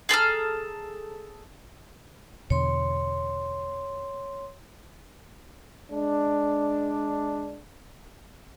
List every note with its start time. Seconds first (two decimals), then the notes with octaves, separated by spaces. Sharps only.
0.09 G#4 A4 A#5 F6
2.50 E2 B2 D3 C#5 C6
5.92 G#3 D4